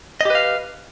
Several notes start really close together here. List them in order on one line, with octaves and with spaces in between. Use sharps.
D#5 G4 B4 F5